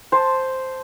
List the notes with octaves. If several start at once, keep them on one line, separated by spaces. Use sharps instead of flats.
C5 A5